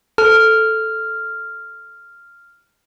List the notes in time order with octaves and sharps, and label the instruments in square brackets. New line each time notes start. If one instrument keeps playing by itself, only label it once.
[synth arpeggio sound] A4 [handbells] F6